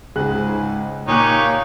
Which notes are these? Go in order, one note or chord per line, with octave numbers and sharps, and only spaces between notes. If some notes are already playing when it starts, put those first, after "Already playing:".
C#2 G#2 G#4 F#6
A#2 A#3 D#4 G4 C#5 G#5 F#6